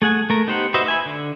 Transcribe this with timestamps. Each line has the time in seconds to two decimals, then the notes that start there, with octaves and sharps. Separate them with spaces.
0.02 A3 G#4 F#5 G#5
0.30 A3 A#4
0.47 B3 D#4 G4 C5 F#5
0.74 F#4 B4 C5 D#5 E5
0.86 E5 G#5 B5
1.05 D3